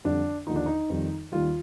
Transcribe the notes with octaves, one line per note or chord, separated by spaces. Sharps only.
F2 D3 G3 D4
D#2 D3 F3 D#4
D4
D#4
F2 D#3 G3
D#2 D#3 G3 F4